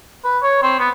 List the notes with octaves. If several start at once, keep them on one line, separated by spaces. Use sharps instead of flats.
B4
C#5
C4
B3